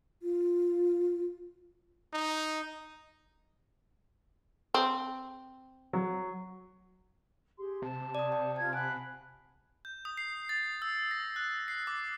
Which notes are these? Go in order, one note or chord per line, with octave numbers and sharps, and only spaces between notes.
F4
D#4
C4
F#3
G4 G#4 C6
C3 A5
D5 D#6
G5
F4 A5 G#6
F#5 G#5 B5 F#6
G6
D#6
C7
A6
E6
A#6
F#6
C7
D6